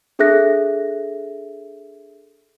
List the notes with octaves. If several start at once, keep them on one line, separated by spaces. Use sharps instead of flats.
D4 G#4 A4 E5 F#6 A#6